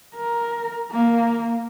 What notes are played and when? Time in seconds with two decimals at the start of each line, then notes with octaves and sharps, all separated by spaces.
0.15 A#4
0.91 A#3